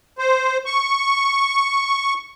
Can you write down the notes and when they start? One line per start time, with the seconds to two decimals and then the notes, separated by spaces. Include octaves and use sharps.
0.18 C5
0.66 C#6